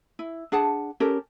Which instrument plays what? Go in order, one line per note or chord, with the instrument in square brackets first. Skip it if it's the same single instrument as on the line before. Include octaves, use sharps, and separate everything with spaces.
[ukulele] E4
D4 G#4 F#5 A5
C#4 G4 A4 A#4